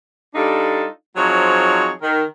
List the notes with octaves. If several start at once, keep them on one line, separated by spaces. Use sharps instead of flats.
G3 D4 D#4 F4 A4
F3 F#3 C4 D#4 G#4 C#5
D#3 A#4